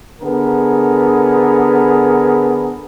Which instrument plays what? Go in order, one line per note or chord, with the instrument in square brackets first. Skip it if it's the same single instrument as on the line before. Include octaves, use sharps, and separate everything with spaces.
[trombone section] D3 B3 G#4 A#4